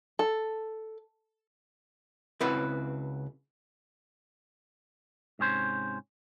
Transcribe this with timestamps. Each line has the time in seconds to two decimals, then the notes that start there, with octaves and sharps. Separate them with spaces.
0.19 A4
2.40 C#2 C4 E4 F#4 B4
5.39 G#2 C3 C#4 C5